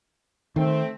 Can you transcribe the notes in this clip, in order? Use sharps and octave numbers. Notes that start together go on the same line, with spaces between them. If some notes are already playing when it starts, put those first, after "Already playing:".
D#3 A3 C4